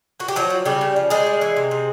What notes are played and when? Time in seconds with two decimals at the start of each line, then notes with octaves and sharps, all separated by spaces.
0.20 A#3 F#4
0.28 G4
0.36 F3 F#3 F#4
0.50 F3
0.65 C#3 G3 G4
0.81 C#3
0.96 F3
1.10 G3 G#3 G#4
1.27 G3
1.41 E3
1.56 C3
1.71 C3